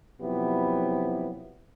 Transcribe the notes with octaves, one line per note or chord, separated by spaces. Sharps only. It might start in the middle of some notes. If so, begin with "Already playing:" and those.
C3 F3 F#3 B3 E4 G4